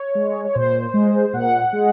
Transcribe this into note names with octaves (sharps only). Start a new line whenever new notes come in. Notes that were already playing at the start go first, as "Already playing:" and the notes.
Already playing: C#5
G#3
C#5
A#2 C5
G#3
A#2 F#5
G#3